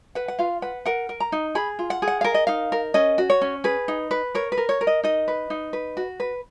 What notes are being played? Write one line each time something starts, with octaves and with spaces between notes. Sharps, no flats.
B4 F#5
F#5
F4 F5
B4 F#5
A#4 F#5
A#4
A#5
D#4
G#4 B5
F4
F#5
G#4
F#5
A#4 F5
D#5
D#4 F5
A#4
C#4 D#5
F#4
C#5
C#4
G#4 B4
D#4
B4
A#4 C#5
B4
A#4
C#5
A#4
D#5
D#4 D#5
B4
D#4
B4
F#4
B4